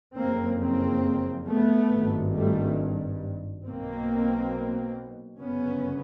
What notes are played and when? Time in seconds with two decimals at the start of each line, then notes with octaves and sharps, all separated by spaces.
0.17 F#1 F2 C#3 A#3 C4
0.61 A#3 C4
1.49 A3 B3
1.92 G#1 G2
2.35 G3 A3
3.66 B1 B2 A#3 C4
5.41 G1 F#2 C#3 B3 C#4